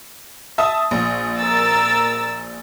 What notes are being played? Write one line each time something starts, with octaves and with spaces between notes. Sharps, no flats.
E5 A5 D#6
A#1
A#4 E6 A6